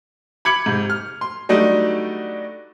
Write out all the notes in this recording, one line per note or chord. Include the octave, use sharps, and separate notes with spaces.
B5 D6 G#6 C#7 F#7
G#2 C3
F6
C6
F#3 G3 A3 D4 D#4